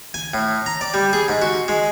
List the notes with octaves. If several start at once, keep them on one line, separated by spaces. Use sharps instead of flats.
G#5
A2
A#5
D5
G3
G#4
G#2
F#4
G#3